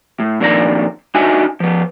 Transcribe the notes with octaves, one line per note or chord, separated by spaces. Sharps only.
A2
F2 A#2 D#3 D4 G#4 A#5
D4 D#4 F#4 D#5 E5 G#5
F3 B3